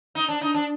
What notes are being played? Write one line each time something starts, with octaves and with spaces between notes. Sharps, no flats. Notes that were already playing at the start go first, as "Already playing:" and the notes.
D#4
D4
D#4
D4